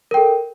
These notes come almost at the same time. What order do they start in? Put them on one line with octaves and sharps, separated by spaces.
A#4 G5 A4